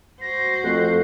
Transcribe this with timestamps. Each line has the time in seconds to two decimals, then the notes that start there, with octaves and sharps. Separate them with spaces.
0.22 F#4 C5 A#6
0.64 F2 A3 F#6